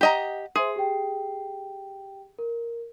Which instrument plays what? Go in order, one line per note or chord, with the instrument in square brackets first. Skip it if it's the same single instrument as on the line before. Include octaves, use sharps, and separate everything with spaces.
[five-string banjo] G4 D#5 A#5 [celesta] F#5
[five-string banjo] G#4 [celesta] C5 E5 C6
[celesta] G4 G5
A#4